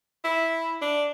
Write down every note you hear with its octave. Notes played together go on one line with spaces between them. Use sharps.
E4
D4